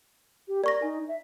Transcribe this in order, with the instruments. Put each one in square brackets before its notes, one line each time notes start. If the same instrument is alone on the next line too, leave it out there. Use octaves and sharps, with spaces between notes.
[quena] G4
[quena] A#4 [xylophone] D5 C#6 A#6
[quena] D#4 [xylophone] G#5
[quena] E5